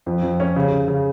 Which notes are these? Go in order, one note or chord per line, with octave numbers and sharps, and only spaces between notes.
F2
F2
C#4
C#3
C#3
C#3